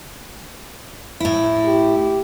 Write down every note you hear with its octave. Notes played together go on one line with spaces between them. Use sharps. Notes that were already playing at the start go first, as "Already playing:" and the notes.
A2 E4
G4